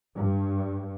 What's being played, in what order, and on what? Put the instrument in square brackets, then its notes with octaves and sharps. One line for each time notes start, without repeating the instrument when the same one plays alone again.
[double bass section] G2